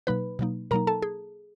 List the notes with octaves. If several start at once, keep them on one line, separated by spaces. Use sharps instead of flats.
B2 F#3 A#3 D#4 B4 B5
B2 F#3 A#3 D#4
B2 F#3 A#3 D#4 A#4 A#5
A4 A5
G#4